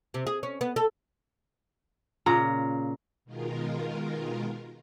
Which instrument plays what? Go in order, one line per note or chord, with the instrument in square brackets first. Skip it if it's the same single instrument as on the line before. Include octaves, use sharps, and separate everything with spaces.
[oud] C3
G#4
C#4
B3
A4
[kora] A#2 C#3 [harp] A#5
[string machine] B2 D#3 G#3 F4 A#4